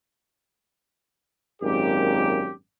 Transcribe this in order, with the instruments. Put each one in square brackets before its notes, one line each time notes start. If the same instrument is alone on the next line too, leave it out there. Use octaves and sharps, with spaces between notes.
[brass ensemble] G#1 F#2 A#2 G4